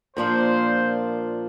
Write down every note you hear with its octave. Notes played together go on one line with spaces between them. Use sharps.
A#2 F3 A#3 D4 F4 C5